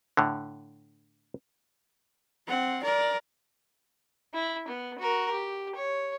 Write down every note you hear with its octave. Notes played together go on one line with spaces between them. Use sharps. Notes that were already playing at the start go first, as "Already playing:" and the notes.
A2 D3
C4 F#5
A#4 D5
E4
B3
F#4 A#4
G4
C#5